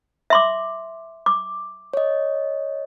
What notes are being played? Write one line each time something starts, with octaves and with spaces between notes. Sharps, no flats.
E5 C6 D6
D6
C#5 D#5